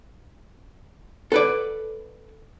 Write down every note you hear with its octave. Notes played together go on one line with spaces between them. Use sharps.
A4 B4 D5